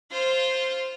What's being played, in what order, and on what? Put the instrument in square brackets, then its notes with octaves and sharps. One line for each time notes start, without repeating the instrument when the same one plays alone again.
[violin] F4 C5